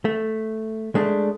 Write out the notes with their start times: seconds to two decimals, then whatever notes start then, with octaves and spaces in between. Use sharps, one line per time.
0.05 A3
0.95 G#3 A3 D4